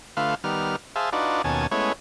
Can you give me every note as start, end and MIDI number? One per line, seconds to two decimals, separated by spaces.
0.17 0.35 50
0.17 0.35 57
0.17 0.35 65
0.17 0.35 71
0.17 0.35 77
0.44 0.76 51
0.44 0.76 55
0.44 0.76 59
0.44 0.76 89
0.96 1.10 68
0.96 1.10 72
0.96 1.10 76
0.96 1.10 77
0.96 1.10 81
1.12 1.42 62
1.12 1.42 63
1.12 1.42 65
1.12 1.42 66
1.12 1.42 71
1.12 1.42 74
1.44 1.67 39
1.44 1.67 47
1.44 1.67 61
1.44 1.67 80
1.44 1.67 81
1.71 1.92 56
1.71 1.92 57
1.71 1.92 59
1.71 1.92 61
1.71 1.92 64
1.71 1.92 73